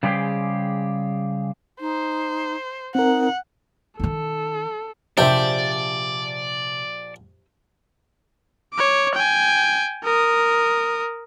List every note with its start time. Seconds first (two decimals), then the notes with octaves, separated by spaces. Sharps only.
0.03 C#3 G3 G#3 G4 G#4 C5
1.81 D#4 C5
2.95 C4 D#4 A#4 F#5
3.99 D#3 D#4 A4
5.18 A#1 C3 D4 G4 C5 D5 E5
8.73 C#5 D6
9.14 G5 G#5
10.03 A#4 D#6